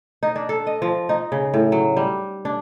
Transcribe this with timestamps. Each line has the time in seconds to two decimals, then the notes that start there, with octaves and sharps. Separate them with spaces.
0.23 D#4
0.36 D4
0.49 A4
0.67 D#5
0.82 F3
1.09 D#4
1.32 C#3
1.54 A2
1.72 F#3
1.97 G3
2.45 D4